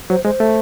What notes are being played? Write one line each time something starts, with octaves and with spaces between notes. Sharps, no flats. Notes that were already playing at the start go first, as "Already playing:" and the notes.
F#3 C5
G#3 C5
A3